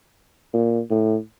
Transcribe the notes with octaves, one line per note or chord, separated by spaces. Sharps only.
A#2
A2